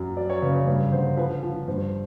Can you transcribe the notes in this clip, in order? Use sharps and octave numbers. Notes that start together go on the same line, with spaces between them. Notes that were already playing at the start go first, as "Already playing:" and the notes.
Already playing: F#2
F#3 D5
C#5
C#3 B4
C#5
G2 C#5
D3 C5
F3 B4
F3
G2 C5